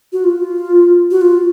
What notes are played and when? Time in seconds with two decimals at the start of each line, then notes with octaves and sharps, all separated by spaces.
0.13 F#4
0.24 F4
1.11 F#4
1.21 F4